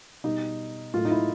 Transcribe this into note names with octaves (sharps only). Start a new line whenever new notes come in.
B2 G3 D#4
A2 F#3 A3 F4
D#4
E4